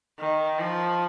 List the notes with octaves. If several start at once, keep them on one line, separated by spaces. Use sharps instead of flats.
D#3
F3